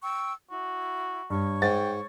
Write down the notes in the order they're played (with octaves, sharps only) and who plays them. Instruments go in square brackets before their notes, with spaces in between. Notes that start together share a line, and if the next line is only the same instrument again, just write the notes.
[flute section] G5 C#6 E6
[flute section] E4 [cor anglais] F#4
[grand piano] G2 [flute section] C#5 C#6
[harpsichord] G#2 [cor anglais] G5 [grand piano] A6